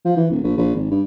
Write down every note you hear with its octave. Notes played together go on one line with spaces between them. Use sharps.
F3
E3
D1
A#1
A#1
G#1
G2